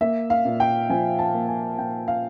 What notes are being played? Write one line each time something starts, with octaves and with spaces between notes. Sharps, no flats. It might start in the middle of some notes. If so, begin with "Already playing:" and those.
A#3 E5
F5
A#2
G5
F3 G#5
A5
A#3
G#5
A#2 G5
F5